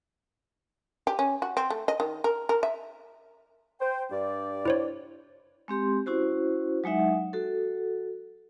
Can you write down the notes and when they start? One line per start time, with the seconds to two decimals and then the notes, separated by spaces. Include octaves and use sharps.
1.07 G4
1.19 C#4
1.42 F#4
1.57 C4
1.70 A3
1.88 D#5
2.00 D#3
2.24 A#4
2.49 A#4
2.63 E5
3.80 C5 G5
4.11 G2 D5
4.65 E4 C5 C#5
5.68 G#3 C4 G4 C6
6.06 C#4 E4 F#4 C5
6.84 F#3 G#3 D#4 E5 F#5
7.33 F#4 A4